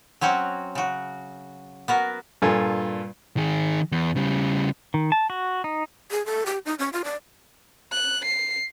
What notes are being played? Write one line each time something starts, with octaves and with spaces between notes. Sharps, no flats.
F#3 C4 C#4 F#4
C#3 F#4
B3 F#4 A#4
G2 A#2 F4 A4 G#5
D#3 G#4
E2
C#3 G3
D#3
A5
F#4
D#4
G#4
A4
G4
D#4
C#4
F4
D5
F#6
C7